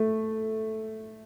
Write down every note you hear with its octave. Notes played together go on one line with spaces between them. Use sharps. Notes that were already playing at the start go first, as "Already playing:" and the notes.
Already playing: A3